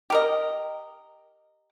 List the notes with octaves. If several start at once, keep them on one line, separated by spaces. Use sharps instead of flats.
G4 A#4 D#5